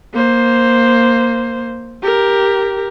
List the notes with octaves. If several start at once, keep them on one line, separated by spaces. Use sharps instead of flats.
A#3 C5
G4 A#4